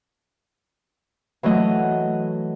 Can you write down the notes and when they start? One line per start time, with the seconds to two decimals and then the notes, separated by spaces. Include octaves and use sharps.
1.43 E3 F#3 A3 D#5